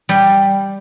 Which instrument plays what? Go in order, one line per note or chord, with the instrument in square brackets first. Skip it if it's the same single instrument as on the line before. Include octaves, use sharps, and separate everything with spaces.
[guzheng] G3